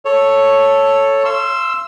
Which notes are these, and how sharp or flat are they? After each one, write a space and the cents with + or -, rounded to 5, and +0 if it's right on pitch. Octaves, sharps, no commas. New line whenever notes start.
A4 +0 C#5 +0
F5 -40 C6 +0 E6 +0